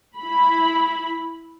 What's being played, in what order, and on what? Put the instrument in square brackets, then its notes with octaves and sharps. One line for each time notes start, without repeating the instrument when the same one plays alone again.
[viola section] E4 B5